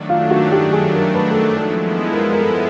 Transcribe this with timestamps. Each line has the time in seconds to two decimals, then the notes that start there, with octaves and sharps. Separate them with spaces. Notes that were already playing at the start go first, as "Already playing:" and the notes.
Already playing: D#3 F#3 A3 D4
0.09 F4
0.30 F#4
0.52 G4
0.73 G#4
0.93 A#4
1.15 B4
1.32 A4
1.36 A#4
1.57 F3 G#3 B3 E4 A4
2.12 A#4
2.32 A#4
2.40 A4